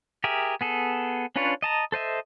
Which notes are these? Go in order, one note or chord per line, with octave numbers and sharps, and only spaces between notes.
G4 G#4 A#4 E5
B3 G#4 A4
C#4 D4 F4 B4 C#5
D#5 A5 A#5
A4 C5 D#5 E5